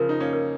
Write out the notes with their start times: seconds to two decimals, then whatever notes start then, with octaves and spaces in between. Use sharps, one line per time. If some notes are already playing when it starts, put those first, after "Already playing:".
Already playing: C#3 F3 A#4
0.09 D#4
0.20 A#3 C#4
0.33 A#4